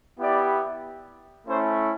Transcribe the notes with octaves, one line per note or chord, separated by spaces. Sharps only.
B3 E4 G4 D5
A3 C#4 E4 C5